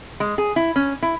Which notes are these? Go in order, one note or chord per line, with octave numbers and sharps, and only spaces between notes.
G#3
G#4
E4
C#4
E4